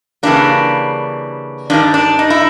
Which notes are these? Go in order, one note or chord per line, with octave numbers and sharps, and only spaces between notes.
C#3 E3 G3 A#3 D4
G2 D#3 G3 D4
D4
D#4
E4